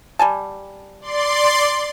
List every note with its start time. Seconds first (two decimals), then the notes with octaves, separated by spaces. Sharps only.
0.19 G3 G#5 A5
1.01 D5 C6